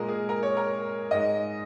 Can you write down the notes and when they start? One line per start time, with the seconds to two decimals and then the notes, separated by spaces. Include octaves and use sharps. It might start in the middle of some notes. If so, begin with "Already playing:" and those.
Already playing: A#2 G#3 A#4
0.08 G#4
0.29 A#4
0.43 C#5
0.57 A#4
1.11 G#2 G#3 D#5